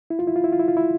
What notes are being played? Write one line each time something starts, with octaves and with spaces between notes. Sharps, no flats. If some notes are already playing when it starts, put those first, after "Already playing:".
E4
F4
E4
F4
E4
F4
E4
F4
E4